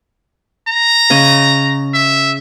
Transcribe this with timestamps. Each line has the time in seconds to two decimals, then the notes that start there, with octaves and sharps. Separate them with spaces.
0.68 A#5
1.10 C#3 C#4 D#5
1.94 E5